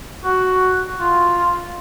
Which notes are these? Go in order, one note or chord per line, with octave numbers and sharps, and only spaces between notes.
F#4
F4